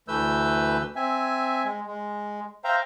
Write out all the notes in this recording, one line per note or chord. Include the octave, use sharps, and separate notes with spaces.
D2 E3 A3 B4 E6 G6
C4 E5 G#5
G#3
G#3
C5 E5 F5 G5 A#5